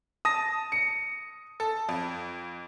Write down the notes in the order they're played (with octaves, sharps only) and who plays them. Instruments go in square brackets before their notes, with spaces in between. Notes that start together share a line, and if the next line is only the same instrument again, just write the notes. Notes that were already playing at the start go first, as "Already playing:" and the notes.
[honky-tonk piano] A5 [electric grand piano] D#6 A#6
[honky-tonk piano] C#7
A4
F2